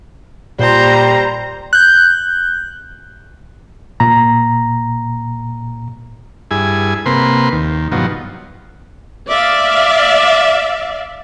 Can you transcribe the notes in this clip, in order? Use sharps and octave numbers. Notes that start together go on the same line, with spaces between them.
A#2 G3 C5 A#5
F#6 G6
A#2 A#5
G2 E4 G#4 G#5
C3 A#3 B4 C6
D#2
G2 B2 D#3 F3 F#3
D5 E5 F5